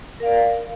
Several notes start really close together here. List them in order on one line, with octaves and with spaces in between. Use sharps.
A#4 F5 D5